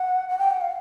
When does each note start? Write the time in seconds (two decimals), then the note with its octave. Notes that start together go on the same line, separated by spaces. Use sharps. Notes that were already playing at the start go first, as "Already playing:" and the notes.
Already playing: F#5
0.29 F#5
0.39 G5
0.51 F#5
0.61 F5